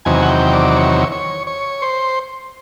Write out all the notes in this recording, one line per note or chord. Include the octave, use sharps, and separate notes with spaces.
E2 C3 D#3 F#3 G#5
F#5
G5
D5
C#5
C#5
C#5
C5